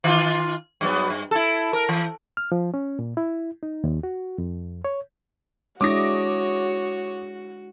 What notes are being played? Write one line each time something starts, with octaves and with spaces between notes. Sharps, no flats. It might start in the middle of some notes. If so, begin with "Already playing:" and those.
D#3 F4
G2 F#3 B3
G2
E4 A4
A#4
E3
F6
F3
C#4
A#2
E4
D#4
D#2
F#4
F2
C#5
G#3 D4 E4 F#4 C#5 D6 D#6 A#6